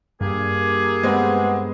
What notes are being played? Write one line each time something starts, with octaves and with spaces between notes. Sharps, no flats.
G2 A#3 G4 G#4
G#3 B3 C4